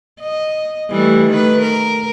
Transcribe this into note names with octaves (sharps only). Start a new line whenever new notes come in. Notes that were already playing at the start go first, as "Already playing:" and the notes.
D#5
E3 G3 A3
D#3 A3 B4
A#4